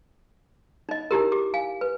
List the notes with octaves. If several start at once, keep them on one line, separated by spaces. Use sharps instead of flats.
D#4 D#5
D#4 E4 G4 A#4
G4 D6
F5 G#5
B4